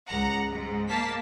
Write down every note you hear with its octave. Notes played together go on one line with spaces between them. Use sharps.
C#2 F#5 A#5
G#2
A#3 A5 B6